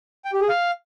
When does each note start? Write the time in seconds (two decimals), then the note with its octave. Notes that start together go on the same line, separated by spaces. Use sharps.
0.25 G5
0.33 G4
0.41 G#4
0.49 F5